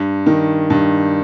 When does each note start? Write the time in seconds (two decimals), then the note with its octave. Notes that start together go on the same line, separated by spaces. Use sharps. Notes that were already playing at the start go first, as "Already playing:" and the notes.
Already playing: G2
0.26 D#3
0.70 G2